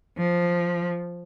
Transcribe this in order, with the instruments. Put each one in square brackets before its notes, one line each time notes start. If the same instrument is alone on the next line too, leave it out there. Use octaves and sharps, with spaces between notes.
[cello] F3